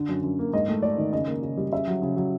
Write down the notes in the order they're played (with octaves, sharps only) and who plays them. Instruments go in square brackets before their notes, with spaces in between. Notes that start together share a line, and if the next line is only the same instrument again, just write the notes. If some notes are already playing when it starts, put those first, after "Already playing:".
Already playing: [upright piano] D3
F#2
F#2
A#3
G#2 D#5
A3
A3 D5
D#3
C#3 D#5
A#3
C#3
G3
C#3 E5
F#3
C#3
F#3